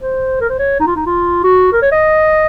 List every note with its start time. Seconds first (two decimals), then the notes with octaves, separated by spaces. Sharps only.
0.01 C5
0.41 A#4
0.49 C5
0.59 C#5
0.80 D#4
0.86 F4
0.96 D#4
1.06 F4
1.44 F#4
1.72 A#4
1.82 C#5
1.92 D#5